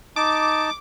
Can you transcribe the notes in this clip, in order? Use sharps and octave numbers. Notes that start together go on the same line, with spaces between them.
D#4 A5 D6